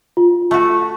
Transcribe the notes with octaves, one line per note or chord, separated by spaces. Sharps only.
F4
A3 F#4